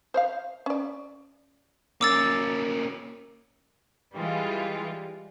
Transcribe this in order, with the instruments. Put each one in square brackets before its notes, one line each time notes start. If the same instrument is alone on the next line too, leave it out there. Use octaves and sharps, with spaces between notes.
[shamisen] C5 C#5 F5
C#4 D5
[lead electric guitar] A#3 C#4 [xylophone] D6 E6 A6
[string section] E3 G3 G#3 F4